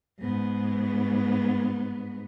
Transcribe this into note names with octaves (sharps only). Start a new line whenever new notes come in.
G#2 B3